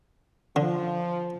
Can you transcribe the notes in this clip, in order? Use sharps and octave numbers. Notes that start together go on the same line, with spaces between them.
D3 F3